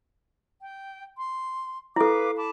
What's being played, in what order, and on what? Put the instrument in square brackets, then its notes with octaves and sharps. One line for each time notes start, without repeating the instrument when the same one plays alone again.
[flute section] G5
C6
[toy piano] E4 A4 [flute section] B4 F5 D6
[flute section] A5 B5 D6